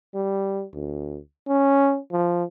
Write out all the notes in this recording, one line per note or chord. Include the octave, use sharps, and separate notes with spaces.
G3
D2
C#4
F3